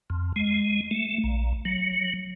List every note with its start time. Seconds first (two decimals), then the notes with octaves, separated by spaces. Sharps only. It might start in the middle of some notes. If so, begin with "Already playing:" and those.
0.10 F2
0.36 G#3
0.91 A3
1.24 A#1
1.65 F#3